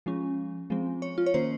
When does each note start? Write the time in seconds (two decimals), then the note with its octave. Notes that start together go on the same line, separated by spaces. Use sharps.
0.06 F3 G#3 C#4
0.70 F3 G#3 C4
1.02 C#5
1.18 F4
1.26 C#5
1.34 D#3 A#3 C#4 C5